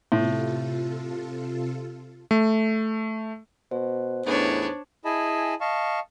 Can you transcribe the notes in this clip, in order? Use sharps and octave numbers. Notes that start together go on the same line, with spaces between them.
A2 C3 F4 A4
A3
B2 C5
E2 A2 B3 D4 D#4 C#5
E4 G#4 D#5 G#5 A5 B5
D#5 F5 A5 C#6